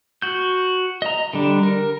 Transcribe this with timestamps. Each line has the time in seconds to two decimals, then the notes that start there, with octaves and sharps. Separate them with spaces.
0.22 F#4 G6
1.02 D#5 A#5
1.33 D3 G3 D4
1.63 A#4